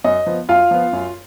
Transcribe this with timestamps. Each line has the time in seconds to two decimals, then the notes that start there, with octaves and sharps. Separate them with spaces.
0.04 F#2 D#5
0.26 F3 B3
0.49 F#2 F4 F5
0.71 F3 B3
0.93 F#2